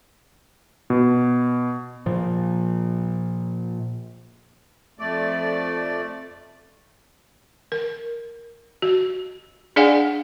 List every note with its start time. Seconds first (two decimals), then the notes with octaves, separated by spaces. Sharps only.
0.90 B2
2.06 A#2 F3
4.99 F2 A3 D5
7.72 A#4
8.82 F#4
9.76 D4 G#4 D5 F5 F#5 G#5